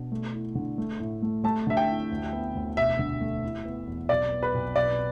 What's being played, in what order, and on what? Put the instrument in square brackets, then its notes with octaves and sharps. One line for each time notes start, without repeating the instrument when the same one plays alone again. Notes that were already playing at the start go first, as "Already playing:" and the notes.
Already playing: [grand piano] B2 D4
A3
E4
D3
A3
A2
A3
[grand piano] A3 [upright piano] A5
[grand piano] D3 [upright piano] E5
[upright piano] G5
[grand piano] E4
D2
B3
D2
[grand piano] E1 [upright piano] E5
[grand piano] D3
A3
E4
B3
E2
[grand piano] B1 [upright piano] D5
[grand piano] B3
[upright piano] B4
[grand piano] B1
[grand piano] B2 [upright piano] D5